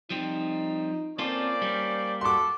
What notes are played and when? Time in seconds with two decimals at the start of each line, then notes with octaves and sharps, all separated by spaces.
0.10 F3 G3 C4 D#4
1.19 A#3 C4 C#4 F4 A4 C5 D5
1.62 G3
2.21 F#4 A4 C6 D6